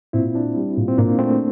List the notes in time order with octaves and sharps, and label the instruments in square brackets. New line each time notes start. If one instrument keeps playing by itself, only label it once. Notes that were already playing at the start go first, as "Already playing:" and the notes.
[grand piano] A#2 [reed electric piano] C4 E4
[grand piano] D4
G3
A#2
[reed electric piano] C4
[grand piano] A#2 [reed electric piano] A#3 D4
[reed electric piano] A3 C4 [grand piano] D4